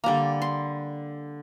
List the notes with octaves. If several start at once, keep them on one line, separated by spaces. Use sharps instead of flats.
D3 G3 A#3 A#5
C6